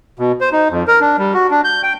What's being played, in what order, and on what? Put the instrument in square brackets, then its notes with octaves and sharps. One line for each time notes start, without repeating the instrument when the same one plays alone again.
[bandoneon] B2
C5
D#4
F2
A#4
D4
G3
F#4
D4
G6
G5